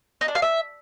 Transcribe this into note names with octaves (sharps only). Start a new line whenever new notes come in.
D#4
D4
F5
E5